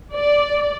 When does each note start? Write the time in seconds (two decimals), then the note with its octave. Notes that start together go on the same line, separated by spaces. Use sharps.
0.12 D5